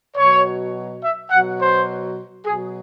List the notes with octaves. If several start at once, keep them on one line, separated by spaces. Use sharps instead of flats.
B2 F#3 C#5
E5
B2 F#3 F#5
C5
B2 F#3 G#4